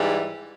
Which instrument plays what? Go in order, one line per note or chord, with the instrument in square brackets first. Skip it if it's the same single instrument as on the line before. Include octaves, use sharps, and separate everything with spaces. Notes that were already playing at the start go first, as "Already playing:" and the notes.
Already playing: [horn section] G#2 E3 G3